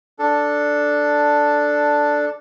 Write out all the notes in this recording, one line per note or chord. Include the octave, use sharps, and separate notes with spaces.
D4 A4